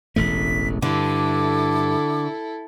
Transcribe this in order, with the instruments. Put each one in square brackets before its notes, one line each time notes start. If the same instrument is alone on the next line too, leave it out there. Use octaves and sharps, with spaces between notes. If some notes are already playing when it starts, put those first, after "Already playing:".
[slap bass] E1 A1 A3 [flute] B6
[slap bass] G2 [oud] D3 [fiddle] E4 A4 [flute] D6